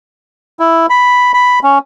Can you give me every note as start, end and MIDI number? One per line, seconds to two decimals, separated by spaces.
0.59 0.86 64
0.90 1.32 83
1.34 1.59 83
1.63 1.78 61